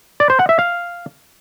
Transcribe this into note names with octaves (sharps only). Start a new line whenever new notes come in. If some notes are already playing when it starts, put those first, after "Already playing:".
D5
C5
F#5
E5
F5